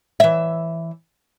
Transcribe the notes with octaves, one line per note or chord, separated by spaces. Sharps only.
E3 E5